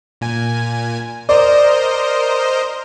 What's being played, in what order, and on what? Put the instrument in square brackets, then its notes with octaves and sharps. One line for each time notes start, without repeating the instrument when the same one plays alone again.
[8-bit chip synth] A#2 G#5
[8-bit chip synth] A#4 C5 D#5 [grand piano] D5